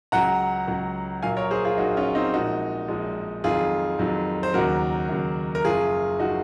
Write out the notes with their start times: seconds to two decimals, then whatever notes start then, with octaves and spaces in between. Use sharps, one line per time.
0.12 C#2 C#3 F#3 F#5 A#5
0.68 C#2 C#3 F#3
1.22 A#1 A#2 F#3 F5 G#5
1.37 A#4 C#5
1.51 G#4 C5
1.65 F4 G#4
1.78 A#1 A#2 F#3 D#4 F#4
1.97 C#4 F4
2.15 C4 D#4
2.34 A#1 A#2 F3 G#3 D#4 F#4
2.88 A#1 A#2 F3 G#3
3.44 F2 D#3 F#3 F4 G#4
3.99 F2 D#3 F#3
4.43 C5
4.54 D#2 C#3 F#3 F#4 A#4
5.09 D#2 C#3 F#3
5.55 A#4
5.64 F#1 F#2 F3 F4 G#4
6.20 F3 D#4 F#4